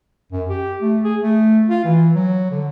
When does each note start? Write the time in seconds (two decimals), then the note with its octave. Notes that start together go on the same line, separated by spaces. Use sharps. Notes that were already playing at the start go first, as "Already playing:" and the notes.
0.32 F#2
0.49 G4
0.82 A3
1.04 G#4
1.22 A3
1.69 F4
1.85 E3
2.15 F#3
2.51 D3